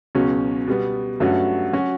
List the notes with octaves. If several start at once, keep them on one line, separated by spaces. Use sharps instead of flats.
C#2 B2 F#3 C#4
B2 G3 B3
G2 F#3 A3 C#4 F#4
F#3 C#4 F#4